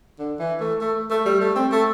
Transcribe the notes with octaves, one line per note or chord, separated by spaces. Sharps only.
D3
E3
A3
A3
A3
G3
A3
C4
A3